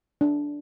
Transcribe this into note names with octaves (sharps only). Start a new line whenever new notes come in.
D4